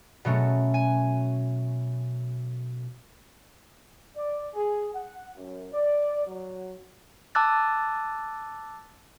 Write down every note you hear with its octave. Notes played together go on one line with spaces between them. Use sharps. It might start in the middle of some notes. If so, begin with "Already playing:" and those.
B2 F#3 A3 C#4
G#5
D5
G#4
F#5
F#2
D5
F#3
A5 D6 E6 F#6 A6